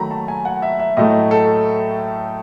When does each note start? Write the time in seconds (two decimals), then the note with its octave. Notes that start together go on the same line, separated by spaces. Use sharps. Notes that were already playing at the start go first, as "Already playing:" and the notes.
Already playing: D#3 F#3 A3 A#5 B5
0.11 A5
0.28 G#5
0.45 F#5
0.62 E5
0.80 E5
0.97 A2 F#3 A3 D#5
1.31 A4